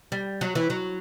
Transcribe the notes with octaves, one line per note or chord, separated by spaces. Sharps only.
G3
F#3
E3
F#3